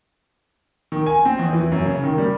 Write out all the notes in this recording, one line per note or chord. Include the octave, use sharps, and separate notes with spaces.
D#3
G#5
C4
E2
E3
F#2
C#3
D#3
G3